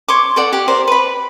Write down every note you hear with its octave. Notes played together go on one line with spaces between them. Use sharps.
C#5 C6 D6
A4 D5 F#5
G4 F#5
A#4 C5 D5
B4 B5